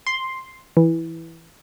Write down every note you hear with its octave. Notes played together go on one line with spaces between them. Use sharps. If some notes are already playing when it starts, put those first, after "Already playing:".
C6
E3